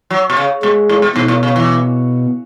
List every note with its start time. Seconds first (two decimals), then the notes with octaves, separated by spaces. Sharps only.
0.10 F#3
0.30 B2
0.37 C#3
0.63 B2 G#3
0.89 A2
1.02 B2
1.15 G#2 B2
1.28 A2
1.43 C#3
1.56 E3